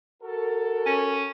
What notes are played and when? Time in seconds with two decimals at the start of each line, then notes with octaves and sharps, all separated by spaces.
0.23 F#4 A4 A#4
0.86 C#4